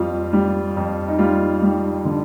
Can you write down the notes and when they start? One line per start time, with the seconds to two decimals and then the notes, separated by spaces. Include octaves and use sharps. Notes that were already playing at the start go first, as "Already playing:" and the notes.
Already playing: F2 G3 F4
0.33 G3
0.76 F2
1.08 D#4
1.19 G3 F4
1.62 G3
2.05 D3